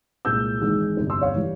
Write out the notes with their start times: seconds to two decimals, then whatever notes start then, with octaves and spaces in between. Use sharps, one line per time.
0.25 C2 A#2 G#3 C4 E6 G6
0.61 G#1 G#2 E3 G#3
0.97 G1 F2 C3 G3 C4
1.10 C6 E6
1.21 C#5 F5
1.36 E3 G3